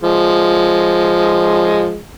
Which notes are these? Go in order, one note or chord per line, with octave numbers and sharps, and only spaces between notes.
F3 G#3